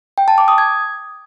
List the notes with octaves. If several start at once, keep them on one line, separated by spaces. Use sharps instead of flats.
G5
A5
D6
D#6
G#6